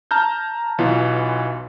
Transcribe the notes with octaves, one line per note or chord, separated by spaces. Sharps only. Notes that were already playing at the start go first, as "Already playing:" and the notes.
A5 A#5 F6 G6
B1 E3 B3 F4